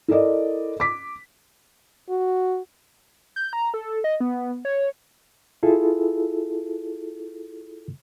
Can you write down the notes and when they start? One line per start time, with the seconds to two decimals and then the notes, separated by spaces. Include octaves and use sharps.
0.08 E4 A4 A#4 D5 D#5
0.80 D6 B6
2.09 F#4
3.36 G6
3.53 A#5
3.74 A4
4.04 D#5
4.20 B3
4.65 C#5
5.63 E4 F4 G#4 A4